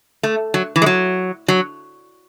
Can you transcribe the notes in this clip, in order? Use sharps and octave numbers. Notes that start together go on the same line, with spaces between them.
A3
F#3
E3
G#3
F#3
F#3